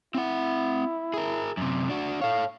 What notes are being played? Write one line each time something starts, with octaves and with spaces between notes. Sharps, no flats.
C4 E4 F#5
G#4 A#4
F#2 C3
D4 F#4
A4 C#5 F5